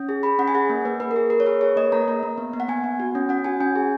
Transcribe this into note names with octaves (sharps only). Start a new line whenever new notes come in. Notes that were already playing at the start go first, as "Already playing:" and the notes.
Already playing: C#4
G#4
G#4 B5
C#4 F#5
G#5
G#4 F#5
A#3
A#3 B4
A#3 B4
A#4
G#4
G#4 A#4
C#5
G#4 B4
G#4 C#5
A#3 D#5
A#3 A#5
A#3
A#3
B3
B3
F#5
B3 G#5
B3
F#4
C#4
C#4 F#5
F#4 G#5
C#4 G#5
G#4